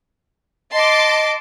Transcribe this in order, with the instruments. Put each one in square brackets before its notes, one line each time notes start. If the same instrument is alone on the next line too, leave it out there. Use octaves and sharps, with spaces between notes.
[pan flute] D#5 [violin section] A5 C6 D6